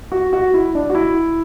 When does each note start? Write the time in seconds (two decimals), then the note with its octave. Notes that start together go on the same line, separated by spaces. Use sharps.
0.12 F#4
0.33 F#4
0.54 E4
0.75 D4
0.90 F#4
0.95 E4